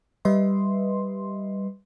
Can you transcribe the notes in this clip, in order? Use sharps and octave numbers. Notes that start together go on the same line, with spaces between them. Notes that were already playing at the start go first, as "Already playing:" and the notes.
G3 B4 D#5 E5 C6